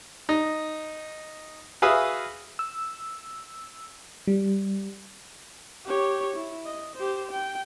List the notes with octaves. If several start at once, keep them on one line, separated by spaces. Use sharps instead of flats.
D#4
F#4 G#4 B4 E5 F5 D#6
E6
G3
G4 C#5
E4
D#5
G4 C5
G5